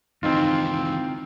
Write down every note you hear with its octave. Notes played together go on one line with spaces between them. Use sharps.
C#2 D#3 E3 C4 D#4 F4